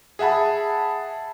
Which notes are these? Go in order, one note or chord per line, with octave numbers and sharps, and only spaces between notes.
G#4 E5 F#5 A5 B5